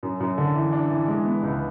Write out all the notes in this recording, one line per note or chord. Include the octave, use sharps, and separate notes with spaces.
F#2
F#2
D3
E3
D4
E3
G#3
B3
C#2